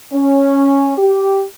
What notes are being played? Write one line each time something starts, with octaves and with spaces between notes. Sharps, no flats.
C#4
G4